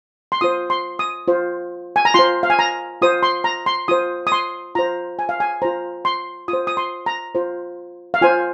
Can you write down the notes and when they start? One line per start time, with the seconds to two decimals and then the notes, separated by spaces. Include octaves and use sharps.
0.32 C6
0.41 F4 C5 D#6
0.70 C6
0.99 D#6
1.28 F4 C5
1.96 G#5
2.05 A#5
2.14 F4 C5 C6
2.43 F5
2.50 G#5
2.59 A#5
3.02 F4 C5 D#6
3.23 C6
3.44 A#5
3.66 C6
3.88 F4 C5 D#6
4.27 D#6
4.32 C6
4.75 F4 C5 A#5
5.19 G#5
5.29 F5
5.40 G#5
5.62 F4 C5 A#5
6.05 C6
6.48 F4 D#6
6.53 C5
6.67 D#6
6.77 C6
7.06 A#5
7.35 F4 C5
8.14 F5
8.21 F4 C5 G#5